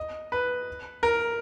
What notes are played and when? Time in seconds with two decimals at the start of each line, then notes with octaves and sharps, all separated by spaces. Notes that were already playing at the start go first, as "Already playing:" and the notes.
Already playing: D#5
0.32 B4
1.03 A#4